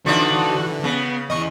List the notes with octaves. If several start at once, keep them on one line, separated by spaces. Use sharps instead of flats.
D3 E3 F3 D4 D#4 F#4
C#3 B3
E2 E3 D#5 C#6